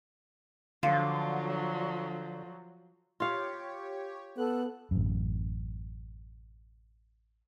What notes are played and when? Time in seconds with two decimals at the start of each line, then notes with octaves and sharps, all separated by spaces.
0.83 D3 F3 F#3 F4
3.20 F4 G4 C#5 F5
4.37 B3 A4 F#6
4.91 A1 F#2